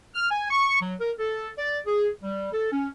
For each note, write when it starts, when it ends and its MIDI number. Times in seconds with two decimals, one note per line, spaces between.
0.15 0.28 89
0.31 0.46 80
0.51 0.77 85
0.81 0.95 54
1.00 1.12 70
1.19 1.49 69
1.58 1.80 74
1.86 2.09 68
2.23 2.51 55
2.53 2.70 69
2.73 2.89 61